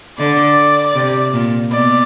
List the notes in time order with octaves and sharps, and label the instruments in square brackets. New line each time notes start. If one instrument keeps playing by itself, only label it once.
[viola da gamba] D3 [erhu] D5
[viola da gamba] C3
A#2
[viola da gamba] B2 [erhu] D5